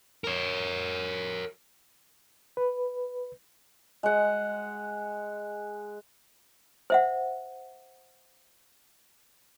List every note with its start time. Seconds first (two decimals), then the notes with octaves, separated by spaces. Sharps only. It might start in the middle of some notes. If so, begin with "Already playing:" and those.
0.24 A#4 C#5
2.57 B4
4.03 G#3 F#5
6.90 C5 E5 F#5